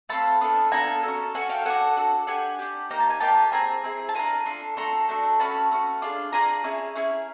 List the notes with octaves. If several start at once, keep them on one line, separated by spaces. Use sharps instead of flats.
A3 C4 F4 A5 B5
B3 D4 F4 A4
B3 D4 F4 A4 G#5 A#5
C#4 F#4 A4
C#4 F#4 A4 F#5 G#5
F5 G5
D4 F#4 A4 F#5 G#5
D4 F#4 A4
D4 G4 F#5 G#5
D4 G4
A#3 D#4 G4 A#5
A5
G#5
A#3 D#4 G4 G5 A5
C4 E4 G#4 G#5 A#5
C4 E4 G#4
A5
D4 F4 A4 G#5 A#5
D4 F4 A4
A3 D4 F#4 A4 A#5 C6
A3 D4 F#4 A4
A3 C#4 F#4 A5 B5
A3 C#4 F#4
D4 F4 G#4
D4 F4 G#4 G#5 A#5
C#4 E4 G#4
C#4 E4 G#4